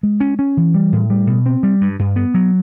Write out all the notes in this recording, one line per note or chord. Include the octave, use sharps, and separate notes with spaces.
G#3
C#4
C#4
E3
G3
A2
G3
B2
C4
G3
G2
G2
B3
F#3